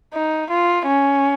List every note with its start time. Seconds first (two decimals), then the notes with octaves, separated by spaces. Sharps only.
0.13 D#4
0.50 F4
0.87 C#4